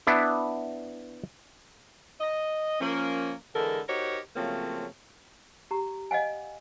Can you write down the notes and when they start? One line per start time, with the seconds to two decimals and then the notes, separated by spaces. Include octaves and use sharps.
0.07 B3 D4 E4
2.20 D#5
2.80 F3 A#3 C#4
3.55 D3 E3 G#3 E4 A4 A#4
3.87 D#4 F#4 G4 A#4 C5 C#5
4.36 C#3 F3 F#3 A3 A#3 C4
5.71 G4 A#5
6.11 D#5 F5 F#5 G#5